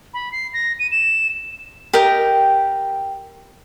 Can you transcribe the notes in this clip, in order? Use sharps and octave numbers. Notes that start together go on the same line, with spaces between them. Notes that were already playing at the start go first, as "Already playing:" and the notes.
B5
C7
A#6
D#7
E7
G4 A#4 D#5 G5